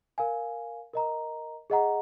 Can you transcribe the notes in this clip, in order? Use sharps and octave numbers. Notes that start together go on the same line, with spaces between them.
A#4 F5 G#5
A#4 D#5 A#5
G#4 D#5 F#5 A#5